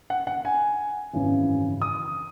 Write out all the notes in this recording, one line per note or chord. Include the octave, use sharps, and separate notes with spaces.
F#5
F#5
G#5
G#1 F#2 C#3 E3
D#6